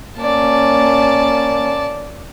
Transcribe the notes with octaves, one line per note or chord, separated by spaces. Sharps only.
A#3 C#4 D5 A5